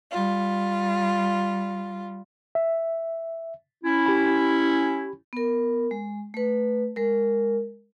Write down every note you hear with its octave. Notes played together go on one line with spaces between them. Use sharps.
G3 F4
E5
C#4 E4
G4 B5
B3 A#4
G#3
A3 B4
G#3 A#4